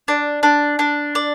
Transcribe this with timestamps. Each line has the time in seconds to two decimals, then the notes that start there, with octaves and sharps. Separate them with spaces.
0.08 D4
0.43 D4
0.79 D4
1.15 D5